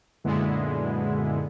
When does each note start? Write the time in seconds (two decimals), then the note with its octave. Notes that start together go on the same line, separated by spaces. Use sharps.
0.24 F#2 A#2 D3 G#3 B3 E4